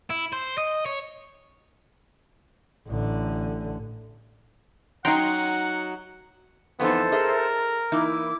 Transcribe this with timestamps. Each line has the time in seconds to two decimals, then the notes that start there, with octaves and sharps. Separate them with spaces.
0.10 E4
0.33 C5
0.58 D#5
0.86 C#5
2.87 A1 D3
5.05 F#3 D#4 F#5 G5 A#5 C6
6.79 F2 E3 B3 D#4 A4 C5
7.12 G#4 A#4 D#5 E5
7.92 E3 A#3 D#4 E4 D6 E6